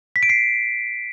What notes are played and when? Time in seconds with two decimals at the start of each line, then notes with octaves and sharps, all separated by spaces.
0.16 B6
0.23 D7
0.30 C7